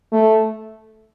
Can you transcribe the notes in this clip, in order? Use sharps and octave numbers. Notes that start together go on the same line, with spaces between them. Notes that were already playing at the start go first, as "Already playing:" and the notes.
A3